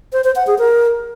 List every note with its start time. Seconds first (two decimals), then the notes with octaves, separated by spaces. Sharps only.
0.13 C5
0.24 C5
0.36 F#5
0.47 G#4
0.59 A#4